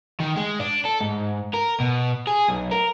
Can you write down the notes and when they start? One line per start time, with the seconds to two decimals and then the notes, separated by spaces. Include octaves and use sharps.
0.20 D#3
0.36 G#3
0.60 D4
0.85 A4
1.01 G#2
1.54 A#4
1.80 B2
2.27 G#4
2.49 B1
2.71 A#4